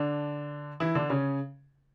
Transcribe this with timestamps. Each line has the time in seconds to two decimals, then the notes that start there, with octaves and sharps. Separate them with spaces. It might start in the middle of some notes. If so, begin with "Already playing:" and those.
Already playing: D3 D4
0.80 E3 E4
0.95 D3 D4
1.10 C#3 C#4